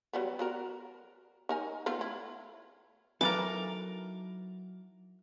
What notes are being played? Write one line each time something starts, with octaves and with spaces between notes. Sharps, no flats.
F#3 G3 B3
B3 F#4 A#4
D#4 A#4 G#5
A3 B3 F4
E4
E3 F#3 D#4 A4 A#4 F5 D6